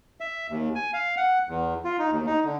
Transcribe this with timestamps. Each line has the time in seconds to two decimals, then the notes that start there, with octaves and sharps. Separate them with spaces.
0.21 E5
0.50 D#2
0.75 G#5
0.94 F5
1.17 F#5
1.49 E2
1.85 F4
1.99 D#4
2.11 D#2
2.27 D#4
2.45 D3